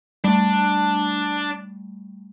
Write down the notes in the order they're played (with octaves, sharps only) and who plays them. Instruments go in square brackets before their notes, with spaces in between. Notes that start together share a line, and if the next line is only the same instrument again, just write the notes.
[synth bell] G3 A3 [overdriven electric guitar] D4